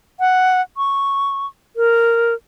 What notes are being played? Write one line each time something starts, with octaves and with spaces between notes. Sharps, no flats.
F#5
C#6
A#4